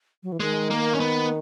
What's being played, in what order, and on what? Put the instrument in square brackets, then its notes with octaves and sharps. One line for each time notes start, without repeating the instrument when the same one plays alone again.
[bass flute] F#3
E3
[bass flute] D#3 [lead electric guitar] G#3
[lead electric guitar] A#3
C#4
B3